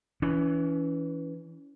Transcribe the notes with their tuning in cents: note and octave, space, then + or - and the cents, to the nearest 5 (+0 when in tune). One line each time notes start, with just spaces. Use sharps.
E3 +0 C#4 +35